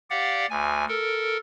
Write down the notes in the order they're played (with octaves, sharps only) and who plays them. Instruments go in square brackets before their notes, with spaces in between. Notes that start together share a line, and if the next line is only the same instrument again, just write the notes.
[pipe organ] G4 D5 F5 F#5
D2 G#5
A4 A#4